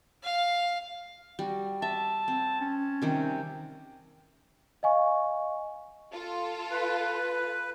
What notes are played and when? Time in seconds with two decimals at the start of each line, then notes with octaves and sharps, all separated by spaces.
0.23 F5
1.39 G3 F#4
1.82 E5 A5
2.28 C4
2.61 C#4
3.02 C3 D#3 G3
4.83 D#5 F5 G#5 C#6
6.12 F4 A4
6.71 B4